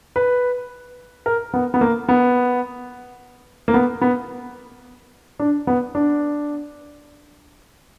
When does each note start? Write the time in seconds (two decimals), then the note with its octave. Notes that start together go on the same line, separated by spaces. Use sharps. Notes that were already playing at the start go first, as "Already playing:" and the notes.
0.16 B4
1.26 A#4
1.54 B3
1.74 B3
1.81 A#3
2.09 B3
3.68 A#3
3.74 B3
4.02 B3
5.39 D4
5.67 B3
5.95 D4